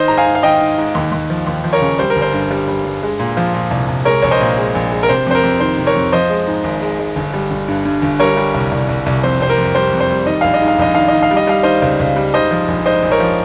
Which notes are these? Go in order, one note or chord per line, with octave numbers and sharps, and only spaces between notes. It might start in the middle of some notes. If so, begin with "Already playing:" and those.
Already playing: D#3 C5 D#5
G#2 A#5
F5 G#5
G#2
F5
D#3 D#5 G5
D#3
G#2
D#2
D#2
F3
D#2
F3
A#4 C#5
C#3
G3 C5
A#4
G1
C5
G2
G3
G3
G2
G#3
A#2
F3
A#2
C2
C2
G#3 A#4 C#5
A#1 C#5
C5 D#5
A#2
G#3
A#1
G#3
A#4
C3 C5
F2 C5
A#4
F2
D#3 C5
C3
A#4 C#5
F2
F3 C5 D#5
G#3
G#2
G#1
G#3
G#3
G1
G3
G1
G2
G2
G1
G3 A#4 C#5
G3
C2
C2
C2
C2
F2 C5
C3 C5
A#4
F2
G3 C5
F2
C5
G3
D#3 D#5
A#1 F5
D#5
G#2
F5
A#1 D#5
D#3 F5
D#3 D#5
F5
G3
D#5
G3 F5
D#3 C5 D#5
C#2
C#2
G3
G#2 C5 D#5
F3
A#1
G#2 C5 D#5
A#1
A#4 C#5
F3